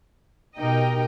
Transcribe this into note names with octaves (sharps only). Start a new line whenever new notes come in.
B2 D#4 G4 A#4 D#5 G5